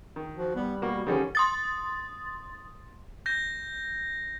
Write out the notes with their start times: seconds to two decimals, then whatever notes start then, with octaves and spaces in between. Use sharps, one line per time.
0.16 D#3
0.36 F3 F#4
0.55 G3 B3
0.82 B2 A#3 F#4
1.07 D3 D#3 F3 G3 C#4
1.35 C6 D#6 A6
3.26 G6 A#6